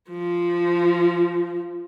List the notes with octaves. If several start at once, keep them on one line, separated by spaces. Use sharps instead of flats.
F3